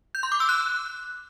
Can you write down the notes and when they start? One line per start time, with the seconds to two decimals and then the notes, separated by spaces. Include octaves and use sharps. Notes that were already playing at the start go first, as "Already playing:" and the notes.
0.15 G6
0.23 C6
0.32 D6
0.40 E6
0.49 F#6